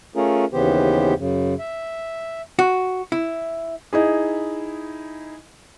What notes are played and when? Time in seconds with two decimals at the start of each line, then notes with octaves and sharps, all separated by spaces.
0.16 A3 C#4 F4 G#4 A#4
0.53 D#2 C#3 E3 B3 G4 C5
1.18 F#2 C#3
1.59 E5
2.59 F#4
3.12 E4
3.93 D#4 E4 G#4